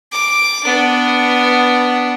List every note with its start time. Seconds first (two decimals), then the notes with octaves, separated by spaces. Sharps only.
0.12 D6
0.64 B3 D4